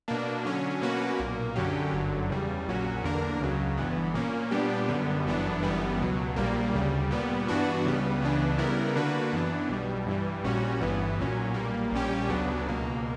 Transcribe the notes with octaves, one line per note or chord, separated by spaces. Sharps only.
B2 A#3 D4
D3 F#3 C#4
B2 A#3 C#4 F#4 B4
B1 A#2 A#3
F#2 D3 F#3 C#4 G4
G1 F#2 D3 F#3
E2 C#3 G3
A#1 A#2 F#3 C#4 F#4
E2 D3 A#3 D4 A#4
C#2 C#3 F#3
G1 G2 E3 B3
A#2 A#3 C#4
A#2 G3 B3 D4 G4
F#2 D3 G3 B3
G1 F#2 E3 B3 D4
G1 F#2 E3 G3 B3
C#2 B2 F#3
A#1 A#2 G3 A#3
D2 C#3 G3
A#2 G3 B3
G2 E3 B3 D4 F#4
C#2 C#3 G3 B3
C#2 C#3 E3 B3 D4
C#3 G3 B3 E4 A#4
D3 A#3 D4 F#4 B4
F#2 E3 B3 D4
B1 B2 G3
G2 E3 G3
A#1 A#2 G3 C#4 F#4
G1 G2 E3 B3
B1 A#2 F#3 C#4
B1 A#2 G3 A#3
A#1 A#2 G3 C#4 G4
D2 C#3 F#3 B3 D4
C#2 B2 A#3